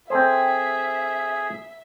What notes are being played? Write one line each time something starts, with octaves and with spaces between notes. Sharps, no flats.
C4 G#4 A4 C5 E5